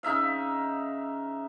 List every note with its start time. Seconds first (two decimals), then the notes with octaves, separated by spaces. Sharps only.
0.03 C#3 D#4 E5 F5